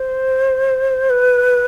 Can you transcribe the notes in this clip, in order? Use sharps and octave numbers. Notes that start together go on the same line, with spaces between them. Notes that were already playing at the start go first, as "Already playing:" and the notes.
Already playing: C5
B4